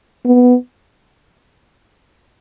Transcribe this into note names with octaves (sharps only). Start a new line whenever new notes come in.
B3